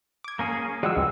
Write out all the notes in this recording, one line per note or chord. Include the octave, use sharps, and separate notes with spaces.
D6 G#6
A#3 C#4 G#4
F3 G3 G#3 F#4 F#5 E6
C#2